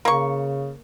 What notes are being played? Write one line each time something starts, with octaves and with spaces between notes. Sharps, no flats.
C#3 A#3 C#6